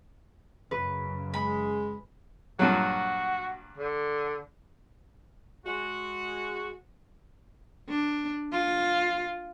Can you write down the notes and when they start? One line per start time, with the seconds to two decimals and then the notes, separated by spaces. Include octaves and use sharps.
0.71 F#2 C#3 B4
1.34 G#3 B5
2.59 G2 A#2 F#3 F#4
3.77 D3
5.66 G#3 F#4
7.89 D4
8.52 F4